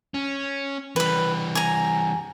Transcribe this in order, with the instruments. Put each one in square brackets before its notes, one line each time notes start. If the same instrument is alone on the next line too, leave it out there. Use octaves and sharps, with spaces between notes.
[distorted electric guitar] C#4
[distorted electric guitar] E3 G3 [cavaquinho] B4 B5
[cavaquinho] G#5 A#5